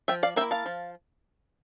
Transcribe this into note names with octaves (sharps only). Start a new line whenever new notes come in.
F3 E5 G5
D5 F5
A#3 E4 E5 G5
F5 A5
F3